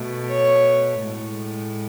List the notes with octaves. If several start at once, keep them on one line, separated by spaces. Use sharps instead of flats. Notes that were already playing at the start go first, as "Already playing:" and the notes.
Already playing: B2 A3
C#5
A2 G#3